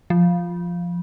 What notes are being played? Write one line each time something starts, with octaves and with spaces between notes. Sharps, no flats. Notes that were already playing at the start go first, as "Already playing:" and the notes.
F3